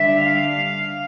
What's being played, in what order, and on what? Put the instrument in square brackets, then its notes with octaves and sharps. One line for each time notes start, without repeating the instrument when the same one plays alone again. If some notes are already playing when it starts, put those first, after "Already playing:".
Already playing: [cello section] D3 G3 D4 E5
F5